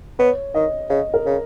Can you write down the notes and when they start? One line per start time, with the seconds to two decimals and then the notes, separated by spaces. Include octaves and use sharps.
0.19 B3 C#5
0.54 D#3 D#5
0.90 C#3 D#5
1.14 A#4
1.26 C#3